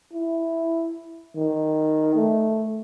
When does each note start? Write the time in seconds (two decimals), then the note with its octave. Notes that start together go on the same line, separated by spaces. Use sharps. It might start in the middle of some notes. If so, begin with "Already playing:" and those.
0.13 E4
1.35 D#3
2.15 A3